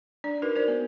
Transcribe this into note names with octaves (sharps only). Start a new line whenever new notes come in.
D4 D5
D#4 F#4 A#4 B4
A#4 C5 D5
B3